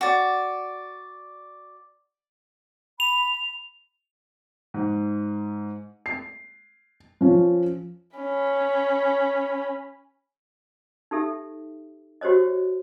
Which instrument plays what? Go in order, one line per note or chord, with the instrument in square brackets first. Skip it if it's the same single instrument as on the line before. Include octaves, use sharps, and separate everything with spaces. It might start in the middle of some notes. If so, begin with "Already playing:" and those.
[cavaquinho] F#4 D5
[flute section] B5 [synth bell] F7
[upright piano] G#2
[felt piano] C7
F3 C#4
[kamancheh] C#4 B5
[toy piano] D#4 G4 A4 E5
F#4 G4 C5 C#5 D#5